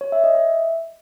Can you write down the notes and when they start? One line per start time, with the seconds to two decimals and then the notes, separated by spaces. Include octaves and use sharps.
0.01 C#5
0.12 E5
0.24 D#5
0.35 E5